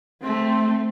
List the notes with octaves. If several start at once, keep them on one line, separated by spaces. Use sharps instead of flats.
A3 C4